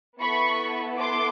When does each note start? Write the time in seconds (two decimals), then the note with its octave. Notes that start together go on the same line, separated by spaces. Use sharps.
0.20 B3 E4 A4 B5 C#6
0.99 C6 D6